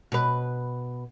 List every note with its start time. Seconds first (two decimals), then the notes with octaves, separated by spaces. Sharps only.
0.12 B2 B4